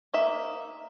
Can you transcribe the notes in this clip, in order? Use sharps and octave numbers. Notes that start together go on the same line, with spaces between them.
A#3 D#4 E5